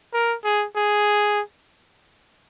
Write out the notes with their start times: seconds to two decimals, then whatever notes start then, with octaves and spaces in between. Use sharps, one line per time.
0.14 A#4
0.44 G#4
0.76 G#4